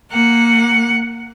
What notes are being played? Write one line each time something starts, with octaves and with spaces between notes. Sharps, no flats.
A#3 F#5